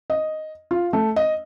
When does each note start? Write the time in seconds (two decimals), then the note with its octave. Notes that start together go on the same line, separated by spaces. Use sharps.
0.10 D#5
0.71 F4
0.93 A3
1.16 D#5